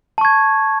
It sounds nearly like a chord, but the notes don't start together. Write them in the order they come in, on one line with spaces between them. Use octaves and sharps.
A5 C#6 G#6